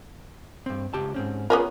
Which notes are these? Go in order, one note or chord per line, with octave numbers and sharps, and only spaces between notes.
G2 C4
C#2 G4 A5
G#2 C4 C#4
B3 C#4 F4 G#4 A#4